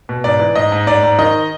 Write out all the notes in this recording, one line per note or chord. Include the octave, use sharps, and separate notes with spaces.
B2
G#2 D5
E3
G#2 D#5
G#2
G#2 D5
G#2
D#3 D#5